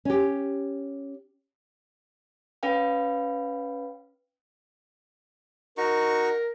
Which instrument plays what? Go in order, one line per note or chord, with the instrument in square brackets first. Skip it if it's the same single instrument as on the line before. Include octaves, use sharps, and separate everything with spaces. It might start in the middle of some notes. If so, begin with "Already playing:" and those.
[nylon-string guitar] C#4 G4
[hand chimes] C#4 B4 F5 G5
[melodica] D#4 F#4 C#6 [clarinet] A#4